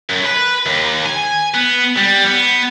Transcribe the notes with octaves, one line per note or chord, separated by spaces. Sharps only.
F#2
B4
D#2
G#5
B3
G3
B3